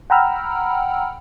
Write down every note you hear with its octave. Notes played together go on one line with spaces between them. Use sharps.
F#5 G5 A#5 B5 E6 F6